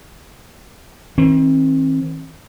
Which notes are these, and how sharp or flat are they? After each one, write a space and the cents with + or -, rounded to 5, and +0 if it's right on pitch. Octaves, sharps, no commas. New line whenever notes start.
D#3 +45 C4 +35